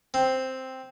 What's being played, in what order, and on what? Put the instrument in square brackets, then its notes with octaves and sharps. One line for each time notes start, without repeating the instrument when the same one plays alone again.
[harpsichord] C4